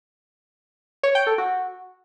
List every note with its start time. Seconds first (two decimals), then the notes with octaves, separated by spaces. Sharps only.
1.03 C#5
1.15 G5
1.27 A4
1.38 F#4